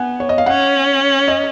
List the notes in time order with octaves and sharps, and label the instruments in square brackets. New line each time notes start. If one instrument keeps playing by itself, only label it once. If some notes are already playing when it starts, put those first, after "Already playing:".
Already playing: [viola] B3 [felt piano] F#5 G#5
[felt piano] C#5
D#5
F5
[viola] C#4 [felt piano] F#5
[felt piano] D#5